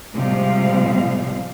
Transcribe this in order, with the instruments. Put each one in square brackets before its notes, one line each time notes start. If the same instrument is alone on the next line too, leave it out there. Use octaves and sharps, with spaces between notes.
[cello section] A2 C3 F3 G3 G#3 F5